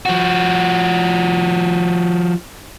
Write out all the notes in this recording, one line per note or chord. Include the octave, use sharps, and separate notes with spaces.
F3 F#4